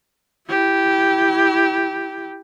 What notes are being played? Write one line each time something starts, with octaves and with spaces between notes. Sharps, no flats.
E4 G4